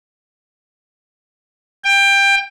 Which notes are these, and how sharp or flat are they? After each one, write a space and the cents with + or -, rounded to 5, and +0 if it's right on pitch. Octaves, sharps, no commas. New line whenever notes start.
G5 +20